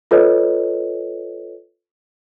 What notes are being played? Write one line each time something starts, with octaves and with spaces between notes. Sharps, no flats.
F4 A4 B4 C#5 D#5